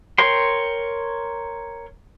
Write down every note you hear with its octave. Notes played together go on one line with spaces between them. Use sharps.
A#4 C#5 G5 C6